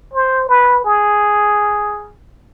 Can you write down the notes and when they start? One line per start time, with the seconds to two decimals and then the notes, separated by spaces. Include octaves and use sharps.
0.13 C5
0.49 B4
0.84 G#4